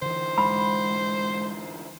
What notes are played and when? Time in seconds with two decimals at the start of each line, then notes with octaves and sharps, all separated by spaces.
0.02 D3 E3 C5
0.38 G#2 B5